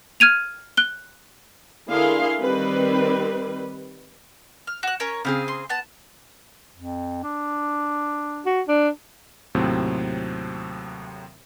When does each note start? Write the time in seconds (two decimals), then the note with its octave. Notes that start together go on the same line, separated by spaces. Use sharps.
0.20 F6 G#6 D#7 F7
0.77 F#6 G7
1.90 D3 E4 G#4 A#4 F5 C6
2.41 D#3 G3 C4 B4
4.67 F6
4.83 F#4 F#6
5.00 C#4 A#4 C#5
5.25 C#3 C4 G#4 F5
5.48 C6
5.69 B3 A5
6.76 F2
7.23 D4
8.46 F#4
8.68 D4
9.55 D#2 A2 C3 F#3 C4